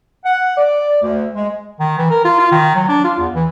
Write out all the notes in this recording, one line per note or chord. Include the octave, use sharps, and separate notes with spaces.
F#5
D5
D2
G#3
D#3
E3
A#4
F4
F4
D#3
F#3
D4
F4
E2
E3